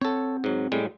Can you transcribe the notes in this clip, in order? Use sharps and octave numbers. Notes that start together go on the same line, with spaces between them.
C4 A4 C#5 F#5
G#2 F#3
A2 G3 G#3